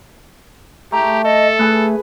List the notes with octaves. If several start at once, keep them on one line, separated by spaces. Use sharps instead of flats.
A3 G4 A#5
A4 D#5
A3 G#4 B4